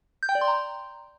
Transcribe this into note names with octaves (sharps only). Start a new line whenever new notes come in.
G6
G5
D5
C6
A#5